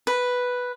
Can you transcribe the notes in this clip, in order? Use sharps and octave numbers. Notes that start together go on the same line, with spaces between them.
B4